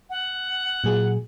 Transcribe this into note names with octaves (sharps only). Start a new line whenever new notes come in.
F#5
A#2 F#3 G#4